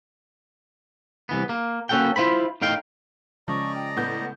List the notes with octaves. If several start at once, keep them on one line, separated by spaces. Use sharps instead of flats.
C2 E3 B3
A#3
A#3 C#4 F#4 A4 F#5 G5
E4 F4 C5 B5
A2 D#4 F5 G5
C#3 F3 G#3 C#4 D5 D#5 A#5 C#6
G5
A2 B3 F#5 G6